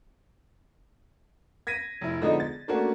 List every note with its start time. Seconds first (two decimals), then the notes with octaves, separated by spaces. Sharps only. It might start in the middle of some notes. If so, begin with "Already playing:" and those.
1.67 G#6 A#6 B6 D#7
2.01 F1 E4
2.22 D3 F3 G#3 B3 D4 D#4
2.40 A6
2.68 A3 A#3 C#4 D4 F#4